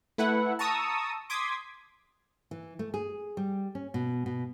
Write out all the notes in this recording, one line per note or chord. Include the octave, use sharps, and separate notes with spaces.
A3 E4 B4 F#5
A5 A#5 C#6 D#6 E6
C6 D6 D#6 G#6 B6
E3
A3
G#4
G3
C#4
B2
B2